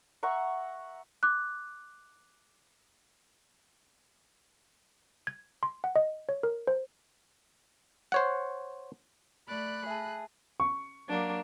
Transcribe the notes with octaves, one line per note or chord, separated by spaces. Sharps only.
E5 F#5 A#5 C#6
D6 F#6
G#6
C6
F#5
D#5
C#5
A#4
C5
C5 C#5 F#5
A3 D5 B5 F#6
G#4 E5 A5
C#6
F#3 A#3 D4